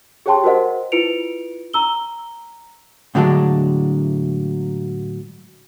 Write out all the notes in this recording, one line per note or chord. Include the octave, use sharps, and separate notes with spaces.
G4 G#4 C#5 G5 A5 C6
F#4 A#4 C5 D#5 F#5
E4 F4 B4 C#7 D7 F7
A#5 E6 G7
A2 D3 F#3 G#3 D4